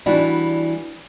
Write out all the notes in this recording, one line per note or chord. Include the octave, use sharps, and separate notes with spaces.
E3 G3 D4 F#4